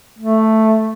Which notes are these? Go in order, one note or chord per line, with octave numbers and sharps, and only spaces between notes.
A3